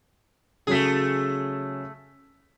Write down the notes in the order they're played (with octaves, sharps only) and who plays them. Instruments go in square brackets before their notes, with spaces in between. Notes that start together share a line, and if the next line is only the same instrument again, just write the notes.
[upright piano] C#3 F#3 B6 [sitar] A3 G#4